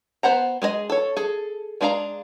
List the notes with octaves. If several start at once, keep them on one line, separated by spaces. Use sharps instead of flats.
B3 C5 F#5 A#5
G#3 G#4 B4 D#5
A4 C#5
G#4 A4
G#3 D4 G#4 F5 A#5